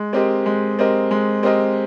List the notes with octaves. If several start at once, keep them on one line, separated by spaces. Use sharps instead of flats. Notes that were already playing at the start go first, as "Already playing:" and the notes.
Already playing: G#3
C4 G4 A#4 D#5
G#3
C4 G4 A#4 D#5
G#3
C4 G4 A#4 D#5